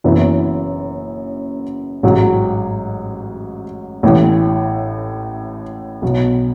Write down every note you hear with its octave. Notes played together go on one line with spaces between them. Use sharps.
F#1 F#2 E3 B3 E4
A1 G#2 F#3
A1 A2 E3
B1 B2 F#3